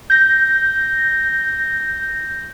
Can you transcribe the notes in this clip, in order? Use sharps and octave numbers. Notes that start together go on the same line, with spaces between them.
G6 A#6